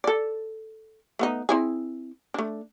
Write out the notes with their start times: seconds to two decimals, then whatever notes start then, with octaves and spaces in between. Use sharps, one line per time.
0.04 A4 D5
1.19 A3 B3 D#4
1.49 C4 E4 G#4
2.34 A3 D4